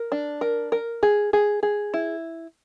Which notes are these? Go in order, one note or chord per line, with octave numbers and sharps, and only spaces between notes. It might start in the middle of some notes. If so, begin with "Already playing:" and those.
Already playing: A#4
D4
A#4
A#4
G#4
G#4
G#4
E4